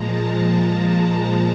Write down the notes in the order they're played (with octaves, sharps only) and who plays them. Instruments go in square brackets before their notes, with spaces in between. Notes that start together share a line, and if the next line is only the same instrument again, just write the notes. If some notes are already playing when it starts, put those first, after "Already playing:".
Already playing: [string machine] A#2 F3 G#3 A5 A#5
A#5